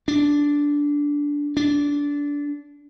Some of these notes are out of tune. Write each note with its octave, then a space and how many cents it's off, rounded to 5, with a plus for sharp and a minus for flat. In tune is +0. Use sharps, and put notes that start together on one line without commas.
D4 -10
D4 -20